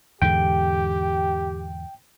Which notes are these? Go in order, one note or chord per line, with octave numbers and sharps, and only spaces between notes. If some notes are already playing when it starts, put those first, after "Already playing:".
E2 G#2 D3 G4 G5